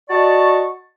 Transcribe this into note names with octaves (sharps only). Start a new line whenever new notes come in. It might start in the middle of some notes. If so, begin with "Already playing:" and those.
F#4 D5 D#5 A5 C#6